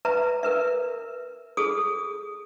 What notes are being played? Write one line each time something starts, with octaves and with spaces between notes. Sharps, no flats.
B4 E5 A#5
A#4 B4 E5
G#4 A4 D#6